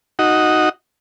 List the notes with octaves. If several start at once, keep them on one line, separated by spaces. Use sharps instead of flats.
D#4 F#4